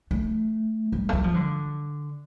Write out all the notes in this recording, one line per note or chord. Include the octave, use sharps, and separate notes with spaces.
A3
G3
A3
G3
F3
D3